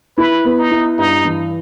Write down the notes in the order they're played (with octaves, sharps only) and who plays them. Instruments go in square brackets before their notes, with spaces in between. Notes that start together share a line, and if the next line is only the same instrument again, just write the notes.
[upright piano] E4 [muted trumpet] B4
[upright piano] B3
[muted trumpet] D#4
[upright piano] E4
[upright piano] G2 [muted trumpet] D#4
[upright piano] E3